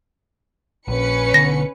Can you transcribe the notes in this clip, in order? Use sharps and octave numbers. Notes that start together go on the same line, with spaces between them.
A#1 C#4 B4 C#7
B1 D3 B3 A#6